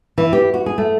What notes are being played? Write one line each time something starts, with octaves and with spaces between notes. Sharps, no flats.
E3
G4
F#4
G#4
A3